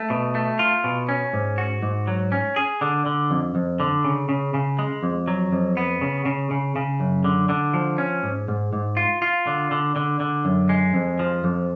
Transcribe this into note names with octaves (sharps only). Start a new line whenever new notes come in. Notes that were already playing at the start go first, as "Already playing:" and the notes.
Already playing: A3
B2
A3
F4
B2
C#4
G#2
F#4
G#2
F#3
C#4
G#4
D3
D3
F2
F2
D3
C#3
C#3
C#3
G#3
F2
F#3
F2
B3
C#3
C#3
C#3
C#3
F#2
D3
D3
F3
C#4
G#2
G#2
G#2
F4
F4
D3
D3
D3
D3
F#2
G#3
F2
F3
F2